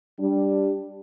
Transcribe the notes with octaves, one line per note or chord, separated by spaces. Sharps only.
G3 D4